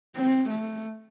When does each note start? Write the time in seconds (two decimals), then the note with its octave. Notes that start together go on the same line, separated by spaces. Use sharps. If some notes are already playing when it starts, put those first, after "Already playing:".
0.16 C4
0.50 A3